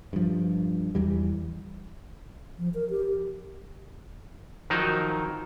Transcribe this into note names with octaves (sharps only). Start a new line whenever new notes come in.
G2 F3
E2 E3 G3
F3
A#4
G4
D#3 F3 F#3 D#4 A#4 C5